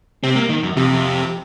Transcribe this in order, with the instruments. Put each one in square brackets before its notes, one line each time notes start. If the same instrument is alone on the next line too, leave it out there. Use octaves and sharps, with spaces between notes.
[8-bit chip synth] C3 [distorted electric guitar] C4
[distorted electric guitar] A#3
D#3
F#2
[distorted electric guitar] F2 [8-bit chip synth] C3
[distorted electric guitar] F2